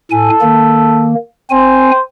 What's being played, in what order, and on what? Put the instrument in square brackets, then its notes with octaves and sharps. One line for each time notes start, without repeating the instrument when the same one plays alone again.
[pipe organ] A2 G#5 [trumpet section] A4
[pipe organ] D#3 A#3
[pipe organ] C4 G#5 [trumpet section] C5